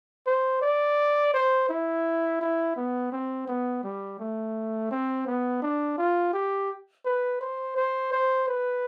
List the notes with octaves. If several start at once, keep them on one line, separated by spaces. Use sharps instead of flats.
C5
D5
C5
E4
E4
B3
C4
B3
G3
A3
C4
B3
D4
F4
G4
B4
C5
C5
C5
B4